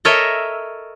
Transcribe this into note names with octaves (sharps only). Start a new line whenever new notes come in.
A4 A#4 C#5 D#5 E5